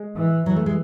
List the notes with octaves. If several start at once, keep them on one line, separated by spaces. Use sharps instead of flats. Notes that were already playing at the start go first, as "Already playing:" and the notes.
Already playing: G#3
E3
E3 F#3
A3
G#3